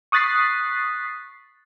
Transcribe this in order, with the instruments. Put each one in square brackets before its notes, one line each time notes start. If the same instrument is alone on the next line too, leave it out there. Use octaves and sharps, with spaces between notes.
[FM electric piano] C#6 D#6 F#6 A6 B6 C7